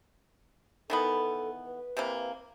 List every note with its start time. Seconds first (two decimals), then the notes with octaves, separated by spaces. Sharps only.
0.90 D#3 E3 B3 A4
1.65 B4
1.97 C3 E3 A#3